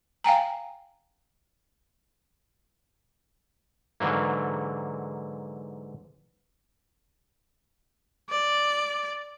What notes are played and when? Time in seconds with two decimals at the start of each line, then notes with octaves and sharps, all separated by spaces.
0.24 F5 G5 G#5 A#5
4.00 G#2 D3 E3 F#3 A#3
8.30 D5